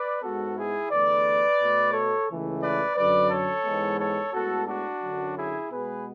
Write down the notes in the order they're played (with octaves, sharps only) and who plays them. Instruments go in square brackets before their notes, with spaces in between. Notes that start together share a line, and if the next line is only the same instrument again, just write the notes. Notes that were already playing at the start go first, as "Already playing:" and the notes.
Already playing: [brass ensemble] B4 D5
G#2 G#3 B3 F#4 A4
E4 G#4
E2 D3 A3 B4 D5
B2 A3
A4 C#5
C#2 C#3 E3 A3
B4 D5
F#2 D3 F#3 B4 D5
A4 C#5
G#2 E3 G#3 B3
A4 C#5
A2 G#3 B3 F#4 A4
D4 F#4
F#2 D3 F#3
E4 G#4
B2 G#3 B3 G#4 B4